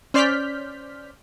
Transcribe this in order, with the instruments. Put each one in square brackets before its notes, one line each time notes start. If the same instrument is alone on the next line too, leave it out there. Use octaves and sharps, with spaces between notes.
[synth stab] C#4 C5 D5 F6 G6 B6